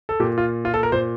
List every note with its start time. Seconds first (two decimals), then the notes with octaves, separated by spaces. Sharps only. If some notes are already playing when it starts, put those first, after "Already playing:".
0.09 A4
0.20 A#2 G4
0.38 F4
0.65 F4
0.74 A4
0.83 A#4
0.92 A#2 C5